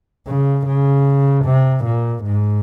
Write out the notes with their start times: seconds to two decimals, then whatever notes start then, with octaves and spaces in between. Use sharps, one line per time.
0.27 C#3
0.67 C#3
1.46 C3
1.85 A#2
2.24 G#2